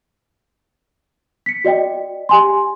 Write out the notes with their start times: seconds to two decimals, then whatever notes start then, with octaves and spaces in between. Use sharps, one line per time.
1.46 B6 C#7
1.64 F#4 D5 D#5 G5
2.29 G4 G#5 C6